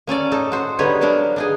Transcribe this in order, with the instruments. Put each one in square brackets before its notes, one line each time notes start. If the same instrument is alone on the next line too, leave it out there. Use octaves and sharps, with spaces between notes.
[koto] A#3 C#4 A4 D5
A2 D#4 A4
F#4 C5
D3 G3 B3 D#4 B4 C#5
F#3 A#3 B3 D4 A#4
D4 D#4 G#4